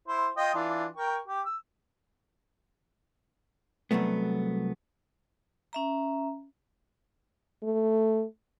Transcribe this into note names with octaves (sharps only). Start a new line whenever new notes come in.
E4 C5
F4 D#5 G5
E3 D4 F4
A#4 G5 C#6
G4
E6
C2 G2 F#3 A3 B3
C#4 E5 A#5
A3